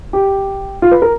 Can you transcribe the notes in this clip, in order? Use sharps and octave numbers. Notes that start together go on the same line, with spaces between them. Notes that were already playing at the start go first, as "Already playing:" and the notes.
G4
F4
B4
A#4